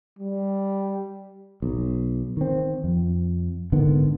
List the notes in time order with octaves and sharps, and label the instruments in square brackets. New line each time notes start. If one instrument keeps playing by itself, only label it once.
[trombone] G3
[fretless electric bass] B1
D#3 C4
F2
G#1 D3 D#3 B3